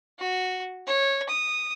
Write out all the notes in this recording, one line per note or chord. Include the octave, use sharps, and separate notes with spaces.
F#4
C#5
D#6